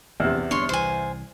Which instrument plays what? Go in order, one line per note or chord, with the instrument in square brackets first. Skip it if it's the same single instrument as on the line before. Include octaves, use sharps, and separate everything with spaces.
[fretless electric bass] A#1 [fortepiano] E2 C3
[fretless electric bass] G1 B3 D4 [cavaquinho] C#5 C6
[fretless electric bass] C2 E3 [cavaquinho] C5 G#5